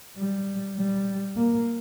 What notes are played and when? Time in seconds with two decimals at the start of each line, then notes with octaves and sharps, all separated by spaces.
0.17 G3
0.77 G3
1.36 A#3